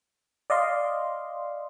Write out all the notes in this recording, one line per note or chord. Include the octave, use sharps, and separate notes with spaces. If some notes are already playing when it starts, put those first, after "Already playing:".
D5 D#5 F5 C6